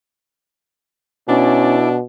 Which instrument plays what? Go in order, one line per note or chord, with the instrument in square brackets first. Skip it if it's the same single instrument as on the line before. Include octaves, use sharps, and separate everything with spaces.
[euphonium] B2 [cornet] C#4 [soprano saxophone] D4 [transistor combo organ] E4 D5